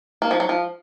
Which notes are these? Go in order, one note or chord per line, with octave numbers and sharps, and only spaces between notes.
A#3
F3
F#3
F3